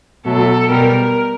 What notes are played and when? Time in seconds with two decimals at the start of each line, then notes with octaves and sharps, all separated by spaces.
0.25 B2 F#3 A3 A4
0.70 B2 G3 A#4